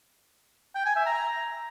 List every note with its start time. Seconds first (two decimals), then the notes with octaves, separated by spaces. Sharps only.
0.75 G5
0.86 G#5
0.96 E5
1.06 A#5